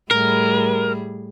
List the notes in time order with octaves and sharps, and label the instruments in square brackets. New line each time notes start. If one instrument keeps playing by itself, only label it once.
[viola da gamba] A2 G3 G#4 [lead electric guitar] A#4